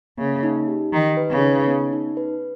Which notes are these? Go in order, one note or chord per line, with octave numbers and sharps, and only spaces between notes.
C#3 A#3
D#4
G4
D#3 D#4
B4
C#3
D#4
B3
D#4
B4